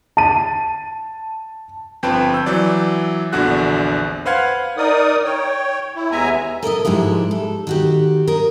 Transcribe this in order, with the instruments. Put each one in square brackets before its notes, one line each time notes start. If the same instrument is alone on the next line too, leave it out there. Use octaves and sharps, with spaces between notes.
[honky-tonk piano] A5 D#7
[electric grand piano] G1 F3 C4 B4 G5 A5
E6 G6
E3 F#3 D5
A#1 E2 D3 F#4 F#6
B4 C5 F5 F#5 F6 G#6
[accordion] D#4 A#4 D5 D#6
C#5 G5
E4
D#2 G#3 B3 E5 G#5 A#5
[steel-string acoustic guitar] A4 A#4 D5 D#5
G#2 F3 G#3 E4 G4
A4
D#3 F#4 G4
A#4 D#5